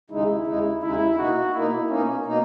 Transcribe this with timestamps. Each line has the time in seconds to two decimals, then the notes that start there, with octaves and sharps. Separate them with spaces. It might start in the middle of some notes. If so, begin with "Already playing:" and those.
0.10 D#2 C#3 G#3 D#4 E4
0.47 D#2 C#3 G#3 D#4
0.82 D#2 C#3 G#3 D#4 E4
1.18 B2 A#3 D#4 F#4
1.54 B2 A#3 D#4 E4
1.89 B2 A#3 C#4 D#4
2.26 B2 A#3 D#4